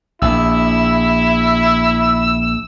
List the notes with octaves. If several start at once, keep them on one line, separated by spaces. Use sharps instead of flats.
A#1 E4 E6